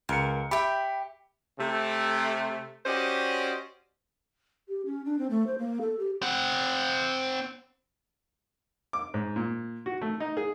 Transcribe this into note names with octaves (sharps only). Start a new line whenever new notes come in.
C#2 A#4 C#7
G4 E5 G5 B5
C3 A3
C#4 F#4 G4 C5 D5 D#5
G4
C#4
D4
C4
A3
C5
A#3
A4
G4
C4 F#5
D6
G#2
A#2
F#4
A3
D#4
G#4